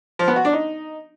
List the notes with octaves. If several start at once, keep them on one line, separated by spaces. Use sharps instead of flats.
F3
B3
F#4
D4
D#4